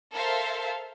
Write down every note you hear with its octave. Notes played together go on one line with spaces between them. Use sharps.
A4 A#4 C5 E5 F5 A5